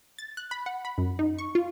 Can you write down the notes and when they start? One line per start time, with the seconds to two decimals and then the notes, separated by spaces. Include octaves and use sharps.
0.19 A6
0.37 F#6
0.51 B5
0.66 F#5
0.85 B5
0.98 F#2
1.19 D#4
1.38 C#6
1.55 F4